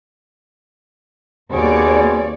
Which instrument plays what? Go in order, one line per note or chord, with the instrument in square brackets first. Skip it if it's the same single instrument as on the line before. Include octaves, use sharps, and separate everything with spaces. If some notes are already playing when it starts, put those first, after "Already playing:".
[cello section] D#2 C#5 D5 [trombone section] B2 C4 G#4